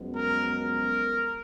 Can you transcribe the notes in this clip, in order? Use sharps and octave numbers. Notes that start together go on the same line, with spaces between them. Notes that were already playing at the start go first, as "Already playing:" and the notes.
Already playing: F#2 F3 G#3 B3
A#4
A#4